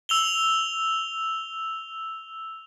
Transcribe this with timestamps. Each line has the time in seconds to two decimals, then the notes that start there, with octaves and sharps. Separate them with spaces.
0.09 E6 F7 G7